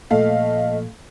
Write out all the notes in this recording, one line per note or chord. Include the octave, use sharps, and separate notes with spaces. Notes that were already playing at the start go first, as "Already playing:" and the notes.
A#2 F3 A3 D#5 F5